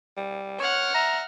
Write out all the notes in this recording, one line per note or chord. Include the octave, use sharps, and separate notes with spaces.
G3
C#5 F#5 F6
E5 A#5